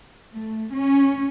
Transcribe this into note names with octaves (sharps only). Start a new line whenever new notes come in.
A3
C#4